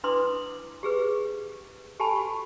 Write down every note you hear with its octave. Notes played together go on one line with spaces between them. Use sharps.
D4 E4 B4 C6 D6 D#6
G4 G#4 B4
G4 A4 G#5 A5 B5
F#4 C#6